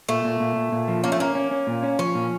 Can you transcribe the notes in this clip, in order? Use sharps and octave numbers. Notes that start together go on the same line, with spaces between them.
A#2 A3
A#2
A#2
A#2
A#2
F3
A#3 C#4
A3
A#3 C#4
C#4
C#4
A#2
C#4
F3 C#4
A#2